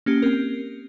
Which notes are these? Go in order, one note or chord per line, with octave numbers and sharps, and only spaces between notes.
A#3 C#4 G4
C4 A#4